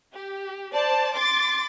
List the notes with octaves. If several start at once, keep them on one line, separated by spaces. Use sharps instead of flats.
G4
C5 D5 A5
C6 D6 A6